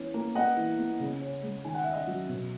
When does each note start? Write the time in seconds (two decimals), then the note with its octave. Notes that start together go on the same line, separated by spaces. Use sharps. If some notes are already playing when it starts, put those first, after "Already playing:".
Already playing: E3 B3 C#4
0.14 A#3
0.35 B3 D#5 F#5
0.57 E3
0.78 B3
1.00 C#3
1.21 C#4
1.43 G#3
1.64 D#3 G#5
1.74 F#5
1.84 C#4 E5
1.93 D#5 F#5
2.07 F#3
2.29 B2